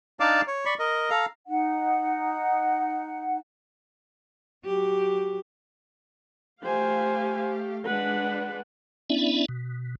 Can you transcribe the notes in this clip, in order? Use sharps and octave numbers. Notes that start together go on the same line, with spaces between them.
D4 D#4 D5 F5 A5 D6
C#5
D5 B5 C#6
A#4 D#5
A4 F5 A#5
D#4 F#5
F#3 G4
A3 G4 C5 F5 G#5
G#3 D4 B4 F#5
B3 C#4 D4 E4 D5 E5
B2